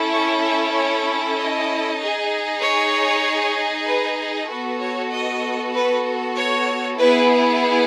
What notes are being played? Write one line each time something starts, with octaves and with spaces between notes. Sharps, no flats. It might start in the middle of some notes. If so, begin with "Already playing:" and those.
Already playing: C#4 E4 A4
C#6
E5
C#5
D#5
D#4 G#4
C#5
B4
B3 F#4 A4 B4
C#5
D#5
B4
C#5
B3 E4 G#4 B4